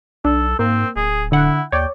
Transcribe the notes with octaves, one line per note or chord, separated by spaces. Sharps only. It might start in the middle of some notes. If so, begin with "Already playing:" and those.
B1 D4 A4
G#2 A#3 C4
D1 G#4
D3 E4 F#5
D#2 C#5 D5 G5